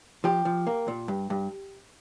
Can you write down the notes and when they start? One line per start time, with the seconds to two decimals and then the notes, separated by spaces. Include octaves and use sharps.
0.24 F3 G4
0.45 F3
0.67 A#3
0.88 A#2
1.08 G2
1.30 G2